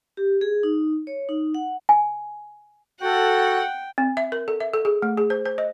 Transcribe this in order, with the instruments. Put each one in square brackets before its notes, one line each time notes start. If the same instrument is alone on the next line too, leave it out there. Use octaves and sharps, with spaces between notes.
[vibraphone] G4
G#4
D#4
C#5
D#4
F#5
[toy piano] G#5
[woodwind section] F#4 A4 [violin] F#5 [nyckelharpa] G5
[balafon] C4
E5
A#4
A4
E5
A4
G#4
A3
G#4
C5
C5
D#5